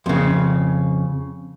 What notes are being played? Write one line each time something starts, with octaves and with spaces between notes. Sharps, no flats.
F2 C#3